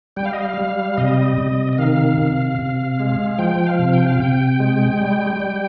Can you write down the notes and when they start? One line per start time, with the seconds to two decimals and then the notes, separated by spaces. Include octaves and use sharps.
0.17 G3 G5
0.25 F5
0.33 D#5
0.42 F5
0.58 G3
0.97 C3 D#5
1.38 C3
1.73 D#5
1.78 D#3 F5
2.18 C3
2.59 C3
3.00 G#3
3.31 F5
3.39 F3 G5
3.66 F5
3.79 C3
3.93 G5
4.07 F5
4.20 C3 G5
4.60 G#3
5.01 G3
5.40 G3